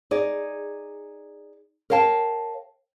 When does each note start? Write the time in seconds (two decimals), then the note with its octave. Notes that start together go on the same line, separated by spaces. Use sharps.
0.11 D#4 G#4 D5
1.90 A#4 C#5 F5 G5 A5